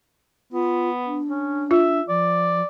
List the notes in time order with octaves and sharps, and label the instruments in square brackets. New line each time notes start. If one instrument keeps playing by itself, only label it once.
[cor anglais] B3 [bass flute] F4
[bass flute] D4
[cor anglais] C#4
[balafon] F4 [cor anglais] E5
[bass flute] F3 [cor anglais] D5